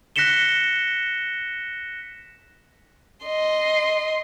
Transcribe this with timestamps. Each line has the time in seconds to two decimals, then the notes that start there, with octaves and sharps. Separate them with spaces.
0.16 F#6 A#6 B6 C#7 E7 G7
3.26 D#5 C6